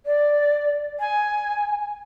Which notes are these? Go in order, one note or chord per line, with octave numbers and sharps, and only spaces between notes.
D5
G#5